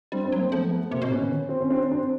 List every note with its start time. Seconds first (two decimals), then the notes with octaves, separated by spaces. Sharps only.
0.12 G3 C4 D4
0.25 C4 D4
0.32 F#3
0.39 A#3 C4
0.52 F3 A3 B3
0.71 A3 B3
0.91 C3 A#3 C4
1.02 B2
1.11 A2 B3 C#4
1.21 D#3
1.31 D3
1.40 D#3
1.49 C4
1.60 C#4
1.70 C4 D4
1.91 C4 D4